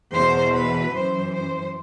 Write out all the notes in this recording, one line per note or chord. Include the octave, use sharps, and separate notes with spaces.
E2 B2 C5
B4
F#2 E3 C5
C5